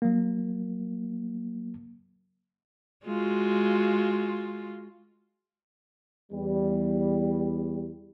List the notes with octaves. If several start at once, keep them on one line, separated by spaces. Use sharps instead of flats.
F#3 A#3
G#3 F4 F#4
E2 G3